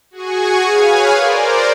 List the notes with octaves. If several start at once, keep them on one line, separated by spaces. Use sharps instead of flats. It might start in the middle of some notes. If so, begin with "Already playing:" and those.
F#4 G#4 G#5 C#6
G#4 B4 C#5 F5 G#5
A#4 C5 D5